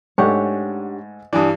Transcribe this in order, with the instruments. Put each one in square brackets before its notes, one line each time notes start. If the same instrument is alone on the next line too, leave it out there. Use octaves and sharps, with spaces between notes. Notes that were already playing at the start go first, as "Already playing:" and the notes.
[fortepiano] G#2 A3 [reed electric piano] D4 G4 F#5 [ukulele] C#5
[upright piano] G2 E3 [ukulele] D4 [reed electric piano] D5 G#5 D#6